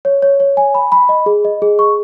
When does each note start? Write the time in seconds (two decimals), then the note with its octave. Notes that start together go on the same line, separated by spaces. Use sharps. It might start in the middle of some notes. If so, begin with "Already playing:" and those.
0.05 C#5
0.22 C#5
0.40 C#5
0.57 G#5
0.74 B5
0.92 B5
1.09 D#5
1.26 G#4
1.45 D#5
1.62 G#4
1.79 C#6